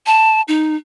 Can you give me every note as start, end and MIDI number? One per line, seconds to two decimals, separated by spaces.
0.06 0.42 81
0.48 0.76 63